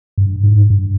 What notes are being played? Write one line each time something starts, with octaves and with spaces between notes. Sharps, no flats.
G2
G#2
G2